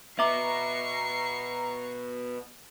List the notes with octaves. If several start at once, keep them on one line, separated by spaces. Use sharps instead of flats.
B2 B3 E5 A#5 C#6 D6 C7